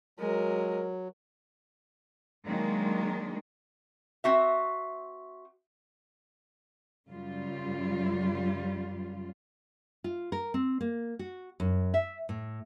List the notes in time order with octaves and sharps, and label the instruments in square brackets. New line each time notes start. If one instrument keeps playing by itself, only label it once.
[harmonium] F#3 [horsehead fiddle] G#3 A#4
[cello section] D#3 F#3 G#3 A#3 D4
[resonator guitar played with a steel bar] C4 F#4 E5
[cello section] F#2 C#3 G3 F4
[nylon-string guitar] F4
A#4
C4
A#3
F#4
F#2
E5
A2